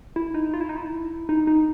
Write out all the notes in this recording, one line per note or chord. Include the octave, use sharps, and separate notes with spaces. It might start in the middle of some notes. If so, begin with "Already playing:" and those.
E4
D#4
F4
E4
D#4
E4
D#4
D#4